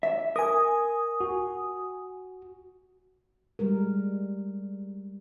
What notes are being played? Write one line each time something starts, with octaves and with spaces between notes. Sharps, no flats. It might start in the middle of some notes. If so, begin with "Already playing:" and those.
E5
A#4 G#5 D#6
F#4
G3 G#3 A#4